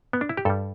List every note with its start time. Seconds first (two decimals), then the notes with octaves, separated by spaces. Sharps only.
0.13 B3
0.21 D4
0.29 E4
0.37 G4
0.45 G2 G3 A4